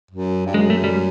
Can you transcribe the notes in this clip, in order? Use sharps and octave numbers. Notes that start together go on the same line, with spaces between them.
F#2
G2
F#2 G#3
A3
G3